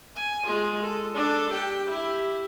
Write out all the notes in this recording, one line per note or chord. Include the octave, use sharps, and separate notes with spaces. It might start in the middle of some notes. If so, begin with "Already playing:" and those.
G#5
G#3 F4
A4
D4 A4
G4 G5
E4 G4